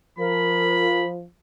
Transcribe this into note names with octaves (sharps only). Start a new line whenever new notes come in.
F3 A#4 B5